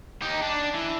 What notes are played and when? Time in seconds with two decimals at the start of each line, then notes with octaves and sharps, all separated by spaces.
0.22 D#4 G4
0.43 D4
0.74 E3